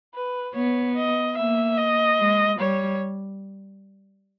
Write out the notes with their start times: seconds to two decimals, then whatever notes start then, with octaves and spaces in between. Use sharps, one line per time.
0.14 B4
0.55 B3 C#5
0.96 D#5
1.37 A#3 E5
1.78 D#5
2.20 G#3
2.59 G3 C#5